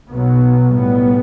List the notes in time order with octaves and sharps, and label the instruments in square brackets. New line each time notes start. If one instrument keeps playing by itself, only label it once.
[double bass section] B1 B2 F#3 B3
B1 A2 G3 B3